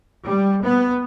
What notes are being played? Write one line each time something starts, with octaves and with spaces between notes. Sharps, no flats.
G3
B3